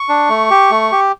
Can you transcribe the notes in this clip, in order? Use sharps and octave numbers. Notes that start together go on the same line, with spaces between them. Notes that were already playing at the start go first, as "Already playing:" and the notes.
Already playing: C#6
D4
A3
G4
A3
G4